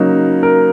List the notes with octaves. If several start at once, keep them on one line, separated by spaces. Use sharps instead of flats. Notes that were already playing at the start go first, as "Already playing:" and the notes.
Already playing: C#3 F#3 A#3 D#4
A#4